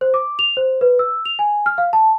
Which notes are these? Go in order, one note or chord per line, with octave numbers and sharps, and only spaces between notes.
C5
D6
F7
C5
B4
E6
F7
G#5
F6
F5
A5